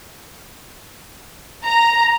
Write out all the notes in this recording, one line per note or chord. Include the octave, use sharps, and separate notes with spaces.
A#5